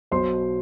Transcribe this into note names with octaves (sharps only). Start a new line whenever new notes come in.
B1 B2 F#3 C5 C6